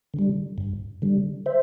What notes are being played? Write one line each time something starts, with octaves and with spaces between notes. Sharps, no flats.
D3 G3
G2
D3 G3
C5 E5